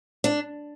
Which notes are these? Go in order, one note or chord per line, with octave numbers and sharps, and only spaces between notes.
D4